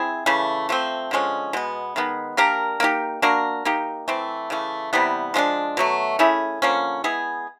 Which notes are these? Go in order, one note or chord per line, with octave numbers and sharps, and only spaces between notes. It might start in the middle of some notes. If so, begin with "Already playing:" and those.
Already playing: C4 E4 G#4
C#3 E3 A3
F3 A3 C4
D3 F3 G#3 C#4
B2 G#3 B3
D#3 G#3 B3
A#3 D4 G4 A#4
A#3 D#4 G4
A#3 D4 F#4 A#4
A#3 D#4 G4
E3 A3 C4
C#3 E3 A3
C3 E3 G3 B3
F3 G#3 B3 D4
B2 F#3 A3
A3 C#4 E4 G#4
D3 F3 A#3 C#4
G#3 B3 E4 G#4